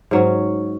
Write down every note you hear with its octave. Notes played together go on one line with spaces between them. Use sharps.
G#2 F#3 C#4